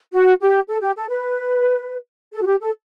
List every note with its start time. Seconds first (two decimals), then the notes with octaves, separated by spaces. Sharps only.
0.13 F#4
0.41 G4
0.68 A4
0.82 G4
0.96 A4
1.10 B4
2.32 A4
2.42 F#4
2.46 G4
2.60 A4